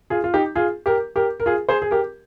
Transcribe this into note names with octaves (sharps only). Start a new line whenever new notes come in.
F4 G#4
F4
D#4 G4
F4 G#4
G4 A#4
G4 A#4
A#4
F4 G#4
G#4 C5
G#4
G4 A#4